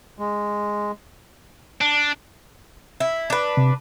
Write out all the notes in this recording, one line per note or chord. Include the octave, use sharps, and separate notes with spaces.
G#3
D4
E4
D4 B4
C3